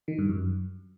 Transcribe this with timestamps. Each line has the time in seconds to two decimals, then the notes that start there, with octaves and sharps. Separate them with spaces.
0.08 D#3
0.19 G2
0.29 F#2